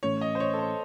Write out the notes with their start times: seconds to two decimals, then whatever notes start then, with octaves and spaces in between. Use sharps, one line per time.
0.03 A2 E3 A3 C#4 C#5
0.21 D#5
0.35 C5
0.40 C#5
0.54 A4
0.59 C5